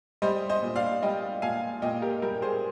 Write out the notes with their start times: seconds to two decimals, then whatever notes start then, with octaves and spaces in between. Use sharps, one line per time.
0.22 G3 C5 D#5
0.49 C5 D#5
0.62 A#2
0.76 D5 F5
1.02 G3 D#5 G5
1.42 A#2 F5 G#5
1.82 A#2 D#5 G5
2.02 G4 A#4
2.22 G3 G4 A#4
2.42 G#4 C5